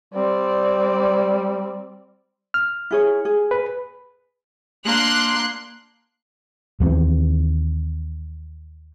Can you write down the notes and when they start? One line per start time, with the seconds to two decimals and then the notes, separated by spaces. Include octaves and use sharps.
0.14 G3 C4 D5
2.54 F6
2.91 E4 G#4 C#5
3.25 G#4
3.51 B4
4.85 A#3 D4 C6 F#6
6.80 D#2 E3 F3 C4